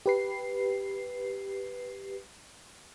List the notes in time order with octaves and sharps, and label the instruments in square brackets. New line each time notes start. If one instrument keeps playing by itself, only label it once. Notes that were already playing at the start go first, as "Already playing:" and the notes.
[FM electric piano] G4 B4 C7